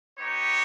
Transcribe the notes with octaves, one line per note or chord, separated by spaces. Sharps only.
B3 D#4 G4 C#5